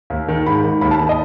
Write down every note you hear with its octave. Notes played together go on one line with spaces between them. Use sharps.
D#2
D#3
G#2 B5
D#3
D#2 B5
A5
D#3
D#5